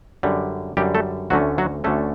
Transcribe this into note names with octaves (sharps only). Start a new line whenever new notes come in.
F#2 D3 G3
F#2 D3 G3 G4
A3 A4
D2 D3 F#3 A3 C#4 F#4
F#3 F#4
D2 D3 A3 C#4 A4